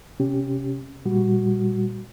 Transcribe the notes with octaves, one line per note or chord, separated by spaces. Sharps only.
C3 C#4 G4
A#2 G3 F#4